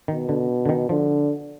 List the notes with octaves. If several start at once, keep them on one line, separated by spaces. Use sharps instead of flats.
B2 D#3
D3
D3
D#3
D3 F3